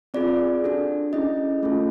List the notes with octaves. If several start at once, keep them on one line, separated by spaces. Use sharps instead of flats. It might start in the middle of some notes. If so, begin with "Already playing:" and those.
C4 F4 G#4 D5
D4 F#4 A4
C#4 E4 G#4 D#5
A3 C#4 F4 A4